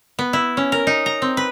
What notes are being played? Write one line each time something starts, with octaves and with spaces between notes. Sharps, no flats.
B3
E4
C#4
A#4
D#4
A#5
C4
B4